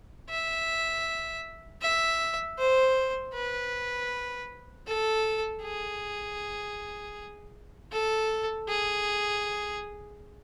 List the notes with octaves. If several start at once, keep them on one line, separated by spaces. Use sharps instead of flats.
E5
E5
C5
B4
A4
G#4
A4
G#4